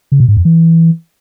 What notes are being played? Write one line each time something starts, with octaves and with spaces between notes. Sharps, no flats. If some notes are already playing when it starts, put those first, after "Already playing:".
C#3
B2
G#2
F2
E3